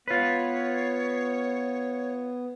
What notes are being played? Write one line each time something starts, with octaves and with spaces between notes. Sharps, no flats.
B3 F4 B4 C#5